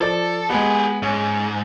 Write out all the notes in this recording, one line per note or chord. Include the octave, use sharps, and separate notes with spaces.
F3 A4 D5
G#3 B3 G4 G#4
G#2 C#4